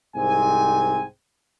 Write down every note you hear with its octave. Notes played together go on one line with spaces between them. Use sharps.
C2 G#2 C4 G#5